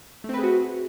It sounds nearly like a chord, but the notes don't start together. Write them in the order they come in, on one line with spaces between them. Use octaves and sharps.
A3 C4 B4 G#4 F#4